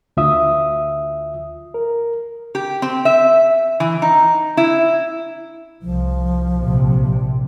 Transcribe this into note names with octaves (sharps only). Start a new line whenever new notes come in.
D2 F4 E5 D#6
A#4
G4
C4
E5
E3
D#4
E4
C2 F3
A#1 C3